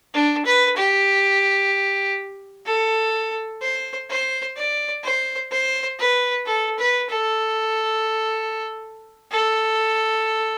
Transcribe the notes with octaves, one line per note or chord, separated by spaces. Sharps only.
D4
B4
G4
A4
C5
C5
D5
C5
C5
B4
A4
B4
A4
A4